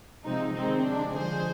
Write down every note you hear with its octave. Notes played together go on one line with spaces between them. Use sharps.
C3 F3 G#3 C4 D#4
C3 D#3 G#3 C4 D#4
C3 F3 G#3 D4
D3 F3 G#3 G#4 C5